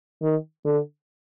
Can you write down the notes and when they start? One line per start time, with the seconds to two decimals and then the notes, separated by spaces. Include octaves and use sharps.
0.22 D#3
0.65 D3